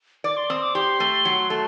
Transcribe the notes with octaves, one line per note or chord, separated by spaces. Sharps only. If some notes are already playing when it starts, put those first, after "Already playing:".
D5 D6
C6
C4 D#6
D6
G4 C6
A3
F#3
A3